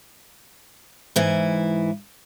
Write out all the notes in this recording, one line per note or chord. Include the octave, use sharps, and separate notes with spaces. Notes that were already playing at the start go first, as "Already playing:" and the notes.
G#2 E3 E4